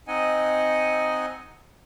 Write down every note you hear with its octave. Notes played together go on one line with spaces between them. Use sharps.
C4 D#4 D#5 F#5 G#5